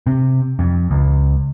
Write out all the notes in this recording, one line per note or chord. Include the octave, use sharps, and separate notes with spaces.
C3
F2
C#2